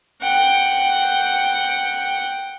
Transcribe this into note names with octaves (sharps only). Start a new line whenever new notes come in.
F#5 G5